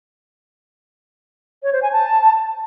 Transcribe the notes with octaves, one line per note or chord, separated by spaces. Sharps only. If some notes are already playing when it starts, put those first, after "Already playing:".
C#5
C5
G#5
A5